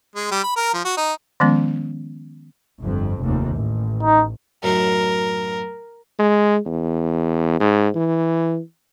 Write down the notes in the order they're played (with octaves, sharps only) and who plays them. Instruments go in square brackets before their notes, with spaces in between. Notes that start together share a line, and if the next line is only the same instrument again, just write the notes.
[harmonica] G#3
G3
B5
A#4
F3
F#4
D#4
[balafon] D#3 F3 G#3 B3 C#4
[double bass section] G1 F2
F1 D#2
A1
[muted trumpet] D#4
[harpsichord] F#2 A2 D#3 [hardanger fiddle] A#4
[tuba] G#3
E2
G#2
E3